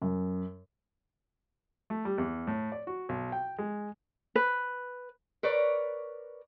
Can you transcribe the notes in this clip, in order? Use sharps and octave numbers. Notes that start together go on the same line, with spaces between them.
F#2
A3
G3
E2
A2
D5
F#4
B1
G5
G#3
B4
A#4 B4 C#5 D5